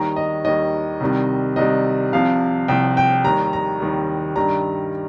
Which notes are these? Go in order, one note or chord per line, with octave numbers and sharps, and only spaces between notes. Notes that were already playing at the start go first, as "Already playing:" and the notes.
Already playing: D#2 D#3 G3 A#5
D#5
D#2 D#3 G3 D#5
C2 C3 D#3 G3
C2 C3 D#3 G3 D#5
C2 C3 F3 F5
C2 C3 F3 G5
G5
D#2 D#3 G3 A#5
A#5
D#2 D#3 G3
G2 D#3 G3 A#5